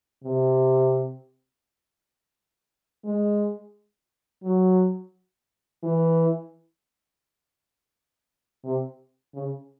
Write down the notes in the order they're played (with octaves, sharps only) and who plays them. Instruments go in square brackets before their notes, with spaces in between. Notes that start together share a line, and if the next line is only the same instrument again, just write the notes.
[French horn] C3
G#3
F#3
E3
C3
C#3